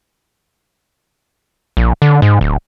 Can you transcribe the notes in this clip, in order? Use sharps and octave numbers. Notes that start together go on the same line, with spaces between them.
A#1
D3
G#2
D1